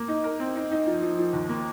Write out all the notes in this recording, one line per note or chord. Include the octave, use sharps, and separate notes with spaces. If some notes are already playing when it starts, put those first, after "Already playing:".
Already playing: A#3
D#4
A#4
C4
D#4
D#4
F3
F3
F3
D#2
A#3